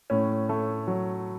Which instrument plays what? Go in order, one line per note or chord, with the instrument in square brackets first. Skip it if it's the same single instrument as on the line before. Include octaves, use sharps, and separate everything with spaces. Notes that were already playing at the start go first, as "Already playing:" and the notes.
[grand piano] A2 C#4
A3
F#3